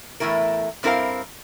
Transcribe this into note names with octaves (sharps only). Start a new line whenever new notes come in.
E2 A2 A3 E4 A#4
G2 C4 E4 A#4 C5 F5